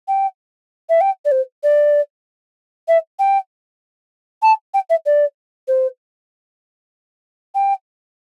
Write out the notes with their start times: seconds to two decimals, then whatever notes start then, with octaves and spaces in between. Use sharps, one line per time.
0.08 G5
0.89 E5
1.01 G5
1.25 D5
1.32 C5
1.63 D5
2.88 E5
3.19 G5
4.43 A5
4.74 G5
4.90 E5
5.06 D5
5.68 C5
7.55 G5